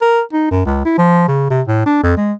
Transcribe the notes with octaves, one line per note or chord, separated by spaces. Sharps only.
A#4
D#4
F#2
C#2
E4
F3
C#3
C3
A2
D4
F2
G#3